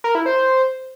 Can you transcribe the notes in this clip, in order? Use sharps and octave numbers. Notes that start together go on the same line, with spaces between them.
A#4
E4
C5